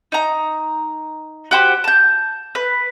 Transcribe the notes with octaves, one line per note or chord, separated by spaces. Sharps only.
D#4 A#5
F#4 G4 C5
A5 G6
B4